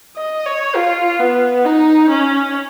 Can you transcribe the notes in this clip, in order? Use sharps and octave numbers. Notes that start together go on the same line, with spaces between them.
D#5
C#5
F4
B3
D#4
C#4